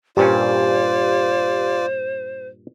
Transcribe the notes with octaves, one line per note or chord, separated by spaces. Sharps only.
G2 A#2 C#4 F4 G4 C5 D5